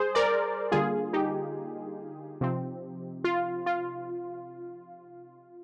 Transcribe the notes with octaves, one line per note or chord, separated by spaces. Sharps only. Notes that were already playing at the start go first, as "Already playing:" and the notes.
Already playing: G3 G#4 C5
A#4 D5
D3 G3 A#3 F4 G#4
D#4 G4
C3 F3 C4
F4
F4